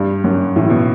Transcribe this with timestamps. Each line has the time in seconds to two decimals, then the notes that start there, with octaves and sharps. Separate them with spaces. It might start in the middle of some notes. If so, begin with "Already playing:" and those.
Already playing: G2 G3
0.24 F#2
0.56 A2 E3
0.70 B2